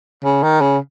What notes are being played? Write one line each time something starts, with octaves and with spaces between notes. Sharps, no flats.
C#3
D#3
C#3